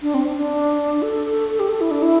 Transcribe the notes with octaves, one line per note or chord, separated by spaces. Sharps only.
D4
C4
D4
D4
A4
G4
A4
E4
D4
E4